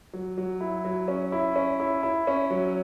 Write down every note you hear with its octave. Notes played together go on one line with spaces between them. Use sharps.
F#3
F#3
E4
F#3
C#4
E4
C#4
E4
E4
C#4
F#3